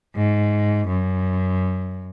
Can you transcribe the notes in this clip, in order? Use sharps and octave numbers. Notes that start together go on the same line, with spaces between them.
G#2
F#2